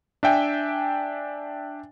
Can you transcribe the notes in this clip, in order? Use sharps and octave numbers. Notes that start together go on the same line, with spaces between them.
D4 E5 G5 G#5